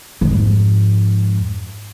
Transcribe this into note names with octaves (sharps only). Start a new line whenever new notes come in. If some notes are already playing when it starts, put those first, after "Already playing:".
F2 G#2